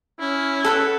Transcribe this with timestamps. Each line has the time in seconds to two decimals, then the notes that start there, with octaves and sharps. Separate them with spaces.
0.20 C#4 E4
0.64 A4 B4 F#5